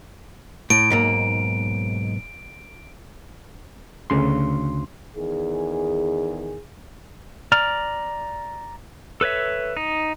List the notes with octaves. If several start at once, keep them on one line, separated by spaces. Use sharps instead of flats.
A2 D7
B1 G#2 A#3
D2 C#3 C6
E2 D#3 G#4
D5 A#5 F6
A4 B4 C#5 E5
D#4